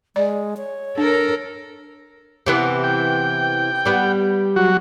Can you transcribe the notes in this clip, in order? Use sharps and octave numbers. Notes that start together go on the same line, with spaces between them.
G#3 D5
C#5
D4 A4 A#4
C3 E3 B3
G5
G3 B3
F#3 F#4